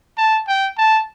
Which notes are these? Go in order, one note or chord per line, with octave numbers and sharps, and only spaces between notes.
A5
G5
A5